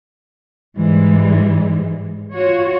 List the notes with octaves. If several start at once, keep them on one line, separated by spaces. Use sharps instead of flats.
G#2 E3 G3 G#3
F4 F#4 C#5